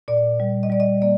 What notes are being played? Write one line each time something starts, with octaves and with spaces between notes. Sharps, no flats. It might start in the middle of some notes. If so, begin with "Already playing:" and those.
A#2 D5
G3
D#5
G3 D5
D#5
A#3 D5